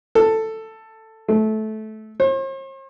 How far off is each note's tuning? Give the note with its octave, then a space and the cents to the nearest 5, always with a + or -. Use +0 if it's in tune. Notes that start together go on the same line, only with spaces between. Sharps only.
A4 +10
A3 -15
C5 +45